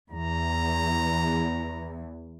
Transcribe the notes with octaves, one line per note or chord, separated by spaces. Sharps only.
E2 A#5